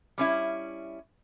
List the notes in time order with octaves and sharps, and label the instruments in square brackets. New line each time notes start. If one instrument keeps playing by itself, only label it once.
[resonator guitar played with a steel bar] G3 C#4 E4